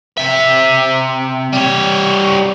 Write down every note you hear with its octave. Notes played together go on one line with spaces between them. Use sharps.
C3 E5
G3 C#5